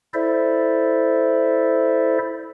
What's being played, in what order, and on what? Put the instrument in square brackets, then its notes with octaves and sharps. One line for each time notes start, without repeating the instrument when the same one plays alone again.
[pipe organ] E4 A4 C5 D5 E5